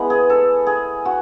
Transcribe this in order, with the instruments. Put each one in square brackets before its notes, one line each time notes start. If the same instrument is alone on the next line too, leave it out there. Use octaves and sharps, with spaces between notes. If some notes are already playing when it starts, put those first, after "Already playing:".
Already playing: [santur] G#3 B3 E4
[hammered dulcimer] G#4
A4
G#4
F#4